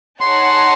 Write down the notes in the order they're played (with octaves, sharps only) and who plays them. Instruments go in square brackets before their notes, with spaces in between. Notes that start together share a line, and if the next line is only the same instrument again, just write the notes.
[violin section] D#4 G#4 C#5 F#5 A5 [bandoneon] C6